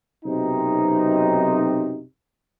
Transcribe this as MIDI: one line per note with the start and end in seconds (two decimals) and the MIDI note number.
0.25 2.02 35
0.25 2.02 42
0.25 2.02 48
0.25 2.02 60
0.25 2.02 63